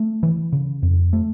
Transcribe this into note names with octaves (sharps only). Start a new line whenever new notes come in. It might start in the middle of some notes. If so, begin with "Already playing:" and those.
Already playing: A3
E3
C#3
F2
A3